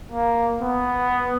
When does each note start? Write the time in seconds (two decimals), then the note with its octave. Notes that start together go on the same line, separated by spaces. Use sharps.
0.12 A#3
0.61 B3